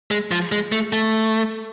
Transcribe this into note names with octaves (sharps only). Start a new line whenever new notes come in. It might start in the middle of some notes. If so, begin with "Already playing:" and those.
G#3
F3
G#3
A3
A3